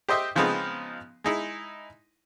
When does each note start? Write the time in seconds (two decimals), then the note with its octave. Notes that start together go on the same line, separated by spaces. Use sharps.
0.09 G4 C5 D#5 E5 G5
0.35 C#3 F3 G#3 B3 C4 D#4
1.24 G#3 D#4 E4